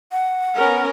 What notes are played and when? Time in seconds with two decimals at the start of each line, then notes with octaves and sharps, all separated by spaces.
0.12 F#5
0.56 B3 C#4 A#4